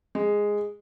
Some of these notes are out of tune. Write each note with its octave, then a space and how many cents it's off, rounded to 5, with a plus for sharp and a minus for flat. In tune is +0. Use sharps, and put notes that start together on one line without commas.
G#3 -5